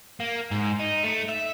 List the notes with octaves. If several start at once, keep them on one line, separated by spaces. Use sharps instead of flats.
A#3
G#2
D#4
A3
E5